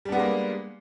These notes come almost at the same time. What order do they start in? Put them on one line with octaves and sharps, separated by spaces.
G3 D4 B3 G#3 A#3